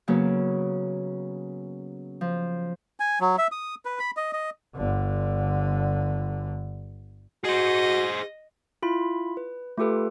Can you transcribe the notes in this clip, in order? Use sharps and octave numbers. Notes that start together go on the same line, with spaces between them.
C#3 F#3 A#3 B3
F3
G#5
F#3
E5
D#6
B4
B5
D#5
D#5
G1 D3
F#4 G#4 C5 D#5
E4 F4 B5
B4
A3 F4 G4 A4 B4